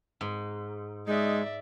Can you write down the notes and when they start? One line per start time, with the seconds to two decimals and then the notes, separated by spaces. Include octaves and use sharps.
0.21 G#2
1.07 G#3 D#4 D5 E5